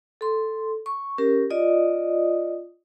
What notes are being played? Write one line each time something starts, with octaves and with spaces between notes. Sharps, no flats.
A4 C6
C#6
C#4 G4 A#4
F4 D5 D#5 D#6